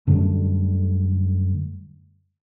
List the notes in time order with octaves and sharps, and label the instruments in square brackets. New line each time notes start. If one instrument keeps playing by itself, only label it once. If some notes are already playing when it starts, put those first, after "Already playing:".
[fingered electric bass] F#2 D3 G3 A3